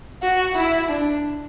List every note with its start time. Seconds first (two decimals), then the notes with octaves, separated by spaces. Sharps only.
0.22 F#4
0.55 E4
0.88 D4